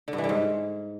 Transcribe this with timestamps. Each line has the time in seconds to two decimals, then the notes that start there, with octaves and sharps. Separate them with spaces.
0.08 D3
0.13 G2
0.18 E3
0.24 D3
0.29 G#2